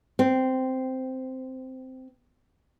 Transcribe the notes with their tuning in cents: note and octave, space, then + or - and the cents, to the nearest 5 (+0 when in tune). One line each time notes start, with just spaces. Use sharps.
C4 -10